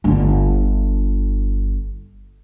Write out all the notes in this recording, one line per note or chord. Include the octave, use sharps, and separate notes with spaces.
G1 D3